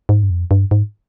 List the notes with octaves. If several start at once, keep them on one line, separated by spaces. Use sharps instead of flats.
G#2
G2
F2
G2
G#2